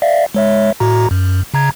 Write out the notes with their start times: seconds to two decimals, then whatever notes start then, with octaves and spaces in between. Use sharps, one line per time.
0.02 D5 E5 F5
0.34 G#3 C#5 E5
0.80 A2 F#4 A#5
1.11 F#2
1.54 C#3 A#5 G#6